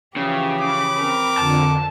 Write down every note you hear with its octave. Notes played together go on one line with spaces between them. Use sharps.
C#3 E3 F3 G4
B5 D6
C4 A#4
F2 D3 A5